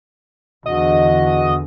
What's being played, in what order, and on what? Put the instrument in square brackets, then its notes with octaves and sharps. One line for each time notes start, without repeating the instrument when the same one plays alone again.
[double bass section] E2 D3 E3 [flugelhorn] F#4 [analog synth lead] D#5